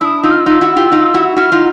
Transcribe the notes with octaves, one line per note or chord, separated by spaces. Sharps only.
D4 E4 D#6 E6
D#4 F4 E6
F6
E6
D#4 F4
E4 F#4
F4 G4
D#4 F4
E4 F#4
E4 F#4 F6
D#4 F4